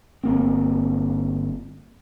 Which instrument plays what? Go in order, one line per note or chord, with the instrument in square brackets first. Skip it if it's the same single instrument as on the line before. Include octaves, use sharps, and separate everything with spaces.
[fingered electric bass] G1 A#3 C4